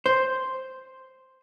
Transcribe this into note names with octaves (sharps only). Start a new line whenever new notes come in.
C5